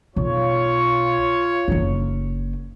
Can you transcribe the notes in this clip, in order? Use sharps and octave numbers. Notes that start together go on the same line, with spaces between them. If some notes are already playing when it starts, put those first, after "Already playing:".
B1 F4 C#5
F#1 D#4